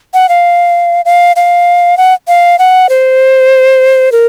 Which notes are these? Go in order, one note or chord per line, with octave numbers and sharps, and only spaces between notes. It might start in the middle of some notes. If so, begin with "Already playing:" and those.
F#5
F5
F5
F5
F#5
F5
F#5
C5
A#4